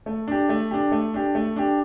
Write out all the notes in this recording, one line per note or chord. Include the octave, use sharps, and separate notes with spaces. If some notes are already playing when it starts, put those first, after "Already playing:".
A3
D4 G4
A3
D4 G4
A3
D4 G4
A3
D4 G4